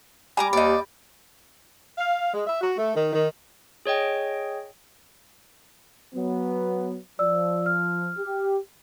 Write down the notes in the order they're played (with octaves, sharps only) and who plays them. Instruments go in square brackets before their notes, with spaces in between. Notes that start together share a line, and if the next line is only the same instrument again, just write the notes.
[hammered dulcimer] G3 [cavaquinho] G#5 A#5 D6
[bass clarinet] D#2 [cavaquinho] D5 D#5
[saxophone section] F5
G#3
E5
F#4
A3
D#3
D#3
[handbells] G#4 C#5 D#5 G5
[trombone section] F#3 B3
[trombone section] F3 [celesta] D5 E6
[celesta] F6
[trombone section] G4